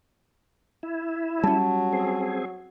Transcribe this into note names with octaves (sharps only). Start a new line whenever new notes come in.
E4
F#3 G3 C#4 A5
C4 G#4